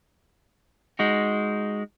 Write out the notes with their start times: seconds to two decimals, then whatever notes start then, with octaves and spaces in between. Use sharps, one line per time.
0.99 G#3 D#4 F#4